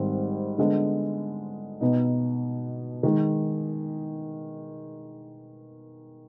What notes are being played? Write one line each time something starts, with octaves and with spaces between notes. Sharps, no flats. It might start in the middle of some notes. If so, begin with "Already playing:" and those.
Already playing: G#1 G#2 D#3 G3 C4
D3 G#3 B3
B2 B3 D#4
D#3 G#3